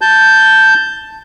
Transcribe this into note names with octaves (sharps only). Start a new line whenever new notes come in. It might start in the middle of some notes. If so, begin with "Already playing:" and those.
A5 G6